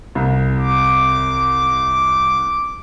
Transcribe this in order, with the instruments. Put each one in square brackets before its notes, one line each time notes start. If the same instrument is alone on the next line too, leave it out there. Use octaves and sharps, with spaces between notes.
[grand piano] C2
[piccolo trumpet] D6